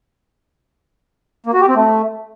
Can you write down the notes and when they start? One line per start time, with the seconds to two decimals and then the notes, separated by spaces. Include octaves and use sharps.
1.46 A#3
1.54 F#4
1.61 G4
1.68 C4
1.76 A3